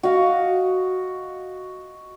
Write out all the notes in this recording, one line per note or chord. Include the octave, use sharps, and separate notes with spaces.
F#4 D#5 F5